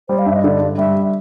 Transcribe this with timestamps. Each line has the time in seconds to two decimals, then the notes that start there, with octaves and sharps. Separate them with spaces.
0.09 G3 C5
0.18 F5
0.26 G2 E5
0.35 D#5
0.43 D3 D5
0.60 G2
0.78 G3 E5